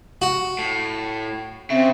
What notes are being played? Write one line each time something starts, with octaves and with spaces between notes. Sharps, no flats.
F#4
A2
C#3 C4 E5